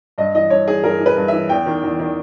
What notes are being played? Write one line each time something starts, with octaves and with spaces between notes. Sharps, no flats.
G2 D#5
E3 D#5
G2 C#5
E3 G#4
G2 A#4
E3
B4
G2
E3 E5
E2 G5
D#3
E2
D#3